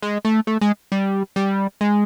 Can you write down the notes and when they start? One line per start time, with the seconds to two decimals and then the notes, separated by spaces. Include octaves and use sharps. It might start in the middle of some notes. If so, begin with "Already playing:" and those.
0.02 G#3
0.25 A3
0.47 A3
0.61 G#3
0.92 G3
1.36 G3
1.81 G#3